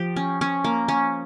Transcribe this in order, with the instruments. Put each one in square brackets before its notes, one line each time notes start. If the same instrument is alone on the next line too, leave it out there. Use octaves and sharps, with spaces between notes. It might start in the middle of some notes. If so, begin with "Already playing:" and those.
Already playing: [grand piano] F3 [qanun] G4
[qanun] C#4
C#4
A#3
C#4